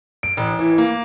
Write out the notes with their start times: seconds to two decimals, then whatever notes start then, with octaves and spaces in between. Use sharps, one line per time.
0.23 D7
0.37 A1
0.59 E3
0.78 A#3